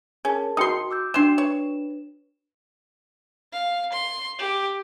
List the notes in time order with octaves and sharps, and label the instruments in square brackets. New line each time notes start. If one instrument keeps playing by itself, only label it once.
[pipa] C#4 [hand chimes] G#4 A#4 A5
[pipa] D#4 C6 [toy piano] F#4 G5 D#6
[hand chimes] D6 E6 G6
[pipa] F#3 C6 [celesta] D4 E7
[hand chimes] B4 [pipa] C#5
[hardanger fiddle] F5
C6
G4